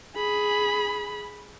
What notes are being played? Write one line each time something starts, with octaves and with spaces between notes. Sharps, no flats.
G#4 B5